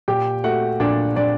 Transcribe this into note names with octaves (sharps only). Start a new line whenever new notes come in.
A#2 G4 G5
A3 F#4 F#5
A#2 D4 D5
A#2 D4 D5